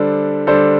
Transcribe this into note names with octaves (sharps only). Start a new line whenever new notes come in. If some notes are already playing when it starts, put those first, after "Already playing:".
Already playing: D3 G3 D4 A4 C5
D3 G3 D4 A4 C5